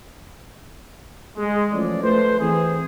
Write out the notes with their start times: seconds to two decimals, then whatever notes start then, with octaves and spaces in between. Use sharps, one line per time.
1.37 G#3
1.73 E3 F3 A3 C#4 D5
2.03 A3 B4 C5
2.40 E3 C4 G#4